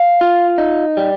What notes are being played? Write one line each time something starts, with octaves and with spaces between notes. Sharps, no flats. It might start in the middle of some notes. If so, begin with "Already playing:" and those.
Already playing: F5
F4
D#4
G3